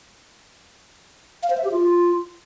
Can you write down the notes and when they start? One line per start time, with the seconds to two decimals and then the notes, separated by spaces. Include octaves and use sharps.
1.43 F5
1.50 C5
1.57 E5
1.65 G4
1.72 F4